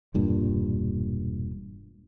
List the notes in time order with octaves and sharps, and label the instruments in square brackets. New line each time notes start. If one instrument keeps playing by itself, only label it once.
[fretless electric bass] E1 G2 A#2